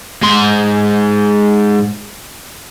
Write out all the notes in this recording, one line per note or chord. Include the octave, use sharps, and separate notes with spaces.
G#2 C6